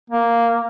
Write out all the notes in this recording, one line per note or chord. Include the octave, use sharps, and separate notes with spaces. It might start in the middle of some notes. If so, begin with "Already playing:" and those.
A#3